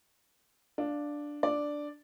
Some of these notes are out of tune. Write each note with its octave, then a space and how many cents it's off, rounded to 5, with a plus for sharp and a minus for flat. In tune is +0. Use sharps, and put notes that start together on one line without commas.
D4 +0 F5 +0
D4 +0 D5 +0